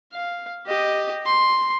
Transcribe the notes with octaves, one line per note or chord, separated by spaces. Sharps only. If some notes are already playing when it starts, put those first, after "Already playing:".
F5
G4 D#5
C6